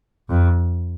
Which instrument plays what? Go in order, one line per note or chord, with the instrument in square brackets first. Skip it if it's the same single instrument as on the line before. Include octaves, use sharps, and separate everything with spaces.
[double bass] F2